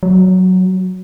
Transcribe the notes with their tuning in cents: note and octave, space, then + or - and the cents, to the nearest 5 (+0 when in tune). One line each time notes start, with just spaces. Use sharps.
F#3 +0